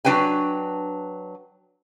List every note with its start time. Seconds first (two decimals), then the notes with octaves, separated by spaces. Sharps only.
0.05 F#3 D4 B4 G5 G#5